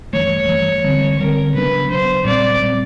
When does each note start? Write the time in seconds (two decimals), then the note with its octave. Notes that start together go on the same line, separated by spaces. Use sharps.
0.13 G2 E3 A3 C#5
0.49 G2 E3 A3
0.84 D3 G3 C4
1.19 D3 G3 C4 A#4
1.55 C#3 F#3 B3 D4 B4
1.89 C#3 F#3 B3 D4 C5
2.25 A#2 G3 C4 D5
2.61 A#2 G3 C4